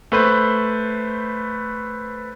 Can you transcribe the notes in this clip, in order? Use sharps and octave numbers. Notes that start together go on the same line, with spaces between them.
A3 B4 C5